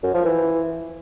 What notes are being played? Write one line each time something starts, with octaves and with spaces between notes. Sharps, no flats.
F#2
F3
E3